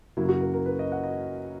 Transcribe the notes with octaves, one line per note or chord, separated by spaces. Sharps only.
F#2 C#3 F#3 A#3 E4
F#4
A#4
A#4
B4
D#5
F#5
D#5